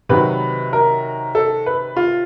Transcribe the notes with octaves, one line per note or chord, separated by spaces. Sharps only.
C3 D#3 F#3 B4
A#4
A4
B4
F4